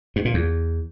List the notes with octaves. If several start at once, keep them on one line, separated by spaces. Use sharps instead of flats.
G2
A#2
E2